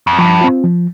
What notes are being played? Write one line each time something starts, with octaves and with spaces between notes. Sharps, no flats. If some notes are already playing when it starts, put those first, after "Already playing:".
F2
G2 F3
C4 F4
F3